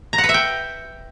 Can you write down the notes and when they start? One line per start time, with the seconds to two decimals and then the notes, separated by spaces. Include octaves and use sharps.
0.13 A#5
0.18 F#5
0.24 B4
0.29 E5
0.34 G5